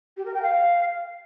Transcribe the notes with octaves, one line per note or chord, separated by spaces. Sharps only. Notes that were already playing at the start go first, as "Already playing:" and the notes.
G4
A#4
G5
F5